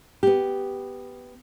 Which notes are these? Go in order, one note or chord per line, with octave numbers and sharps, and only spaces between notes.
B3 G4